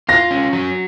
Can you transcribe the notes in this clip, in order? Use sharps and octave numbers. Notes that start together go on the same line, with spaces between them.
F4 A#6
C#4
F#3